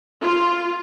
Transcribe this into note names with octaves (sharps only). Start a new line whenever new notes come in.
F4